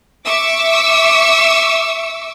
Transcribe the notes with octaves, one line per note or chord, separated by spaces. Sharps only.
E5 C#6 D6 E6